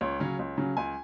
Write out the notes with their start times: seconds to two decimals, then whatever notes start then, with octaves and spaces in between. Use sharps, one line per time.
0.01 C#2 C#5
0.20 C#3 F#3 C#4
0.39 C#2
0.57 C#3 F#3 C#4
0.77 C#2 G#5